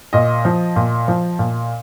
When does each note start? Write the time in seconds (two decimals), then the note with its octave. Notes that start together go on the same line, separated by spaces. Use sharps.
0.13 A#2 D#5
0.45 F3
0.76 A#2
1.08 F3
1.39 A#2